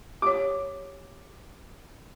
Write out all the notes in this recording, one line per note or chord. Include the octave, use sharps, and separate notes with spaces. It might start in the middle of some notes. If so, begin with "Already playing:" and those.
G4 C#5 D6